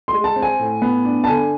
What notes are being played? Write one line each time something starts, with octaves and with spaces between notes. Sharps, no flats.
G#3 C6
A5
C4
G#5
A2
B3
D4
A5
D3 G#5